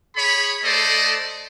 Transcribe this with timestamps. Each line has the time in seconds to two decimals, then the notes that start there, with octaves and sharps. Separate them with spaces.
0.16 G#4 C#5 B5
0.64 A3 A4 C5 D5 D#5